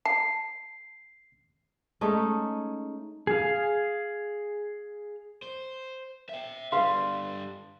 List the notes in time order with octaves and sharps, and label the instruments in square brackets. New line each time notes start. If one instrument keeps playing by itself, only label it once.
[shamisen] A5 [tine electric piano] C7
[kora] G#3 A3 C#4 D#4
[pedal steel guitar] G#4 F5
[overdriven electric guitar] C5
E5 G5
[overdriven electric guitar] D3 G3 [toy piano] B4 F5 [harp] C6